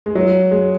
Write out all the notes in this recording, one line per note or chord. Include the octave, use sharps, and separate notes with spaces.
G#3
F#3
G#3